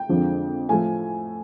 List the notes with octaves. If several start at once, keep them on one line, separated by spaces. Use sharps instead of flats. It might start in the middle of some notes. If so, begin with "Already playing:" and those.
Already playing: G5
F2 D3 F3 G#3
A2 F3 A3 G#5